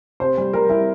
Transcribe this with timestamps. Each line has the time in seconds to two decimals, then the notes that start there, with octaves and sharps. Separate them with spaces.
0.20 C3 C5
0.37 G3
0.53 G3 A#4
0.69 G3 E4